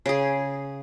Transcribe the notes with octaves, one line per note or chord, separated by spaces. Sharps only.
C#3 G#4